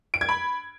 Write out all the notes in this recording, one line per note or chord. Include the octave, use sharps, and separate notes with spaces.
D7
G#6
B5